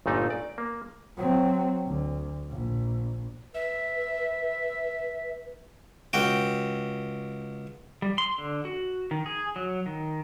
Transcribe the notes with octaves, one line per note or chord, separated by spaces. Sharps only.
G1 A#2 A3 D#4
D5
A#3
F#3 C4
D2
A#1
B4 E5
C#2 F#4 G5
G3
C6
D3
F#4
D#3
G#4
F#3
D#3